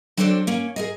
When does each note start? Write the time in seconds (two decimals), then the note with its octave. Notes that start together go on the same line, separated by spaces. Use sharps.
0.17 F#3 C4 D4 A4 C5 D5
0.47 A#3 C#4
0.76 G#4 A#4 D#5